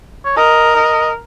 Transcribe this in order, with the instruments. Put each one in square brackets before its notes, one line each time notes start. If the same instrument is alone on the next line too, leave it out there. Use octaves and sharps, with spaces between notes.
[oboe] C#5
[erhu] A#4 [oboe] D#5
[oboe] D#5